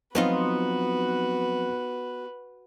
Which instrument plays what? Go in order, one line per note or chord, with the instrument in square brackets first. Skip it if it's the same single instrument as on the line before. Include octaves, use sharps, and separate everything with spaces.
[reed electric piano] F3 F#3 C4 [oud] B3 D#4 F4 [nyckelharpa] F#4 B4